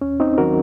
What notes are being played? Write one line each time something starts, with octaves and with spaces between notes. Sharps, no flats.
D#2 C#4
C4 D#4
D#3 F#3 F#4 A#4